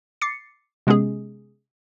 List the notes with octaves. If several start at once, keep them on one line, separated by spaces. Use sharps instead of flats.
D6 A6 C7 C#7
C3 G#3 B3 C#4 G#4